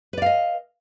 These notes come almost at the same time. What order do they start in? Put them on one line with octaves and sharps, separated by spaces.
B4 D5 F5 D#5